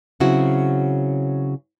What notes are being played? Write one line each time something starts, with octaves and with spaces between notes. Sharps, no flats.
C#3 F#3 C4 E4 F#4